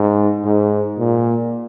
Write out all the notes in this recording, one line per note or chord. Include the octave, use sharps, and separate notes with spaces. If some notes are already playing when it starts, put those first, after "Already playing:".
Already playing: G#2
G#2
A#2